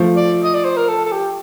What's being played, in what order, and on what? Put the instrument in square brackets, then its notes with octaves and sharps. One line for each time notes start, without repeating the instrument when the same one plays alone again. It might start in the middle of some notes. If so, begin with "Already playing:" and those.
Already playing: [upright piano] F3 A3
[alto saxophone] D5
D#5
D5
C5
A#4
A4
A4
G4